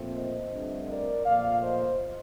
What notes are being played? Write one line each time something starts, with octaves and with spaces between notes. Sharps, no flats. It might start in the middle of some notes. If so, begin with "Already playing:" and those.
Already playing: A#2 F3 A3 C4
C5 D#5
G2 D3 A3 C4
A#4 D5
A#2 F3 A3 D5 F5
C5 D#5